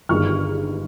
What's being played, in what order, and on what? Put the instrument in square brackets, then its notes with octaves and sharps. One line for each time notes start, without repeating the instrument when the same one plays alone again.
[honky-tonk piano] G1 G2 D#3 G#3 C#6 F6